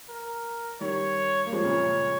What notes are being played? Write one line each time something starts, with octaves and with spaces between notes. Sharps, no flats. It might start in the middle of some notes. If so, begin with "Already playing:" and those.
A#4
D#3 G3 C#5
A#3
F3 G#3 C#5
A#2 C#3